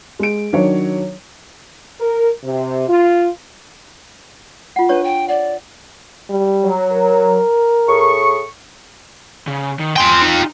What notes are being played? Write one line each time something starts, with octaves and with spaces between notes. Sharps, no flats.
G#3 D7
D#3 F#3 D4 C#5
A#4
C3
F4
F4 F#5
D4 B4 C#5 C#6
G5
D5 F#5
G3
F#3
A#4
A2 G#4 C#6
C#3
D#3
F4 G5 G#5 C6
D#4